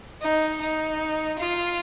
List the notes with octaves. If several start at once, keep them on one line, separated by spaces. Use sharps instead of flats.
D#4
D#4
F4